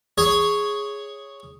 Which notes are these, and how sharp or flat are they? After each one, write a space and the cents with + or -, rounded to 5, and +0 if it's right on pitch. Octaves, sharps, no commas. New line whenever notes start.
G#4 +0 C#5 +0